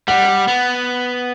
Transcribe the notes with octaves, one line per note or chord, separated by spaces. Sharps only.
G3 F#5
B3